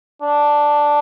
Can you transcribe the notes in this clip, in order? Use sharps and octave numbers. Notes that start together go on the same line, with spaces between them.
D4